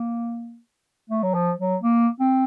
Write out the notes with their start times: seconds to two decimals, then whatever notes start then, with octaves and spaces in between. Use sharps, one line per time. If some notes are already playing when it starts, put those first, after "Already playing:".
Already playing: A#3
1.10 A3
1.23 F#3
1.34 F3
1.59 F#3
1.82 A#3
2.20 C4